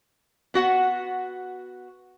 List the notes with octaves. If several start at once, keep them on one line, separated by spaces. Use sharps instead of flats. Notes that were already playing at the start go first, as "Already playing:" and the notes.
B3 F#4 F#5